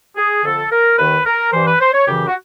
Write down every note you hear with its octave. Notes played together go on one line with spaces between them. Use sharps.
G#4
F2 D3 A4
A#4
D#2 D#3 B4
A#4
G2 E3 C5
B4
C5
C#5
F#2 C#3 E3 G4
F#4